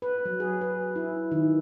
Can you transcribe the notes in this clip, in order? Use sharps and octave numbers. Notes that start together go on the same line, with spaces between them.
B4
F#3
G#4
B4
E4
D#3